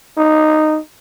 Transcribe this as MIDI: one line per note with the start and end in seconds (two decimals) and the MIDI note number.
0.18 0.78 63